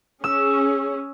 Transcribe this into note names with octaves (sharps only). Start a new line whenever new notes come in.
C#4 G#4 E6